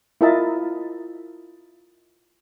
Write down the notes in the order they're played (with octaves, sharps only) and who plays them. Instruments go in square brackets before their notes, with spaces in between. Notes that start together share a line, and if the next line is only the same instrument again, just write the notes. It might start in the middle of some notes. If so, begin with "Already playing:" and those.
[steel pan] E4 F4 A#4 D#5 E5 A5